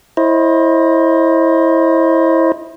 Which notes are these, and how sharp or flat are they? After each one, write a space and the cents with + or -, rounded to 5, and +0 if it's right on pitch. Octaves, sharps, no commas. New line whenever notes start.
E4 -5 C5 +30 D#5 +0